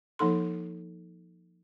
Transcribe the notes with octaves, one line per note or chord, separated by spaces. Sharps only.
F3 A#3 D#4 A4 C6